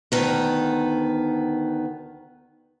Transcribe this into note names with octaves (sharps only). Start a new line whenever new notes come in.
D2 D#3 B3